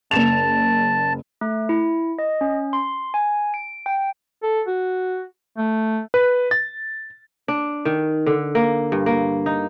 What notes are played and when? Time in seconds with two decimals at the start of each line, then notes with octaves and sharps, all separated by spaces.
0.11 F#1 A5 E7 F7
1.41 A3
1.69 E4
2.19 D#5
2.41 C#4
2.73 C6
3.14 G#5
3.54 D7
3.86 G5
4.43 A4
4.68 F#4
5.58 A3
6.14 B4
6.51 A6
7.48 D4
7.85 D#3
8.26 D3
8.55 A#3
8.92 G2
9.06 A#3
9.46 D#4